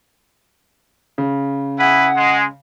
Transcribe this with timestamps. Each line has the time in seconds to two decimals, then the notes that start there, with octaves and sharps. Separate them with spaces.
1.18 C#3
1.78 E4 G#4 B4 F#5
2.16 G#3